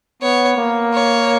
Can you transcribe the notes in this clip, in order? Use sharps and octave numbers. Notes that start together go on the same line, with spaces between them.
B3 C#5
A#3
C#5